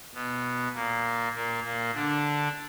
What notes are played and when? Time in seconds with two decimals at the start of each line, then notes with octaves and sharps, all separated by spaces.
0.14 B2 B3
0.74 A#2 A#3
1.34 A#2 A#3
1.64 A#2 A#3
1.94 D3 D4